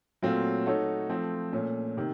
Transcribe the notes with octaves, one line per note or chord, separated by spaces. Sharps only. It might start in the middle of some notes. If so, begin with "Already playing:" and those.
A#2 F#3 A3 C4 F4
A3 D#4 F#4 A4 C#5
F3 A3 C4
A#2 A3 C#4
C3 D#3